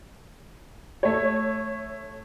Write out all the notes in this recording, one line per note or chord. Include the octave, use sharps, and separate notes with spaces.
A3 C#5